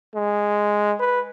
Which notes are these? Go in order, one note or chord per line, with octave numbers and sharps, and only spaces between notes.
G#3
B4